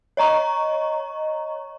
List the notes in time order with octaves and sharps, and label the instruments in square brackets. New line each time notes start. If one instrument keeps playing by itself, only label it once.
[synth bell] C#5 D#5 A#5 C#6